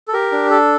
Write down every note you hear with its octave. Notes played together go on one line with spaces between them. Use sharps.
A4
G4 A#4
D4
A4